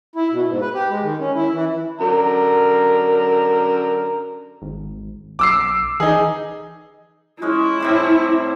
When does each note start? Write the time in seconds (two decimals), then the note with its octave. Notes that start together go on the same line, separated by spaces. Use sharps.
0.16 E4
0.32 B2
0.48 G#2
0.61 B4
0.74 G4
0.90 G#3
1.03 D#3
1.19 C#4
1.35 E4
1.51 E3
2.01 F#2 D3 A#4 A#5
4.62 G#1
5.39 B1 D6 E6 C7
6.00 E3 D#4 G#4
7.42 G#3 C#4 E4 G#4
7.80 A2 C3 G3